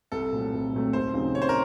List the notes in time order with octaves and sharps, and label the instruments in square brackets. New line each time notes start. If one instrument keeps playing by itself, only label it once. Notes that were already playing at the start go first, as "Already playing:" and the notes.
[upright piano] C2 [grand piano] A4
[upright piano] A#2 F#3 A3 C4
C2
A#2 F#3 A3 C4
[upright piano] D#2 [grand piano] C5
[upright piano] C#3 F#3 C4 D#4
[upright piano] D#2 [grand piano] C#5
[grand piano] C5
A#4